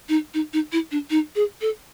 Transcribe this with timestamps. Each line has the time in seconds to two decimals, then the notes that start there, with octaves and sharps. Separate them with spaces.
0.09 D#4
0.34 D#4
0.53 D#4
0.72 E4
0.91 D4
1.10 D#4
1.36 G#4
1.61 A4